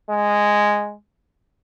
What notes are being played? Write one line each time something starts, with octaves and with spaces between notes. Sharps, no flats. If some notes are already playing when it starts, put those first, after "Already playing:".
G#3